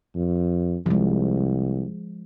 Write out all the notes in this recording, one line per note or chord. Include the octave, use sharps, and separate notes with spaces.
F2
C2 F3 G#3